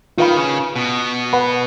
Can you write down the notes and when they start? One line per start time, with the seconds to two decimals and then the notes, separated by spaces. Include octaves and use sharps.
0.18 D#3 F4 B4 F5 B5
0.37 C#3
0.76 B2
1.33 B4 F#5 B5